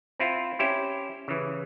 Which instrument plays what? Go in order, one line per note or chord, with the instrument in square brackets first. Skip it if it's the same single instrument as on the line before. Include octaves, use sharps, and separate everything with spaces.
[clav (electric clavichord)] C4 E4 F4
C#4 E4 G4 C5
C#3 E3